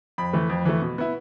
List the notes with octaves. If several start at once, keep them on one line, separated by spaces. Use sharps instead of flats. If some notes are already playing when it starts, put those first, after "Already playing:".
F2 B5
E3 A3
F2
E3 A3
B2
B3 E4